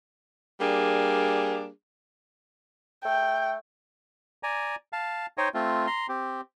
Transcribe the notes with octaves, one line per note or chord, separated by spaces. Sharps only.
G3 A#3 D4 G#4
A3 G5
D5 G#5 A#5
F5 A5
D#4 C5 C#5 D#5 G5
A3 C4 F4
A#5 C6
C4 G4